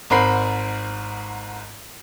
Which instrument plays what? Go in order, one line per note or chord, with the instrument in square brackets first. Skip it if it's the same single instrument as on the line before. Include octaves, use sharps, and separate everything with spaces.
[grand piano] G#1 G#2 A#4 C5 B5 C7